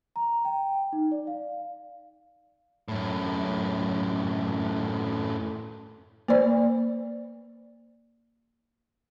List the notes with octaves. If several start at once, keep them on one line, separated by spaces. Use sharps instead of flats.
A#5
G5
D#4
D5
F5
F#2 A2
A#3 B4 C5 D5